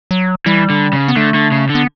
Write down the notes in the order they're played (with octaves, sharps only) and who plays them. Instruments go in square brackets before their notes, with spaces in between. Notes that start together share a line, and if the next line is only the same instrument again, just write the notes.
[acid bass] F#3
[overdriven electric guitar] E3 [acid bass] G3
[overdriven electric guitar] D3
C#3
[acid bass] B3
[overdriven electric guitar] D3 [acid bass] A3
[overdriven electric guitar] D3
C#3
D3
[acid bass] B3